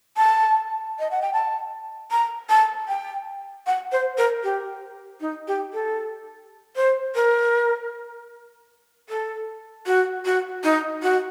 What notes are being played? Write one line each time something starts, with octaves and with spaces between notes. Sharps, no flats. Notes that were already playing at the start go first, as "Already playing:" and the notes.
A5
D#5
F#5
G5
A5
A#5
A5
G5
F#5
C5
A#4
G4
D#4
G4
A4
C5
A#4
A4
F#4
F#4
D#4
F#4